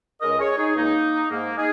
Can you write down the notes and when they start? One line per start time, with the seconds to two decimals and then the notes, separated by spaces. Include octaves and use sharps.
0.21 C#2 C#3 G#3 A#4 D#5
0.39 G#4 C#5
0.58 D#4 G#4
0.75 C#2 C#3 G#3 A#3 D#4
1.30 G#2 G#3 A#3
1.57 D#4 G#4